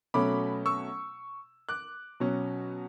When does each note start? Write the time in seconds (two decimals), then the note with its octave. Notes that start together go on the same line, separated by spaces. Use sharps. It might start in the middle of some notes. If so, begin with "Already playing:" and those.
0.14 B2 F#3 A3 C#4 B5 D6
0.66 C#6 E6
1.69 D6 F#6
2.20 B2 F#3 C#4